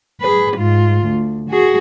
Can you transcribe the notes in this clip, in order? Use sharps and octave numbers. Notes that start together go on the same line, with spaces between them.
G#4 B4
G#2 F4
D2
F#4 G#4